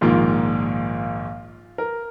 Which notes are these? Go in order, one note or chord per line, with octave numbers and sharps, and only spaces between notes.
A#1 G#2 D#3 A#3 F4
A#4